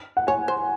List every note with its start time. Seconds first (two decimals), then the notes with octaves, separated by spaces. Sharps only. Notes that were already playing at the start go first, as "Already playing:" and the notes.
0.17 F#5
0.27 C#5 G#5
0.48 C5